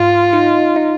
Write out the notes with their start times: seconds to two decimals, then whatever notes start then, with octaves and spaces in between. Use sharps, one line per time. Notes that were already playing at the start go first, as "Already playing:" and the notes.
Already playing: G#2 F4
0.33 D#4
0.76 D#4